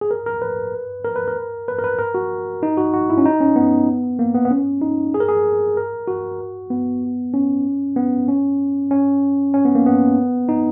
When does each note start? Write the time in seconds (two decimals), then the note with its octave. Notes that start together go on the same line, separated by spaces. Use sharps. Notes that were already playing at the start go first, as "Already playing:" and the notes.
0.01 G#4
0.11 A#4
0.26 A#4
0.42 B4
1.05 A#4
1.16 B4
1.28 A#4
1.68 B4
1.78 A#4
1.84 B4
1.99 A#4
2.15 F#4
2.63 D#4
2.77 F#4
2.93 F#4
3.10 E4
3.18 C#4
3.26 D#4
3.41 C#4
3.56 B3
4.19 A#3
4.35 B3
4.45 B3
4.51 C#4
4.82 D#4
5.14 G#4
5.20 A#4
5.28 G#4
5.77 A#4
6.08 F#4
6.70 B3
7.34 C#4
7.96 B3
8.28 C#4
8.91 C#4
9.54 C#4
9.65 B3
9.75 A#3
9.86 B3
10.49 D#4